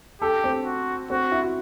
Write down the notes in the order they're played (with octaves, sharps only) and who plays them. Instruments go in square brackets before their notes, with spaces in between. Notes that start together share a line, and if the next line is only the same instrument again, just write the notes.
[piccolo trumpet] G4 [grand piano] A4
[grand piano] C4
[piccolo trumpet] F#4
[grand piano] C4 [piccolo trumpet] F#4
[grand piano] E4
F#4